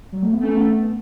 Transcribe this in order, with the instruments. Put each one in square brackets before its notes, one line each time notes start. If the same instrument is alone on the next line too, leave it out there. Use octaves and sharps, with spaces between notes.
[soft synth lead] F#3
A3
B3
[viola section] A3 [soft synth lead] C#4
[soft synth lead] B3